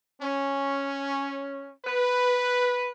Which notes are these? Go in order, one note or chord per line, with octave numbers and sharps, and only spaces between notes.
C#4
B4